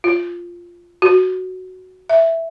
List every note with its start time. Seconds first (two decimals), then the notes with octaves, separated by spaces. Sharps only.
0.04 F4
1.02 F#4
2.09 E5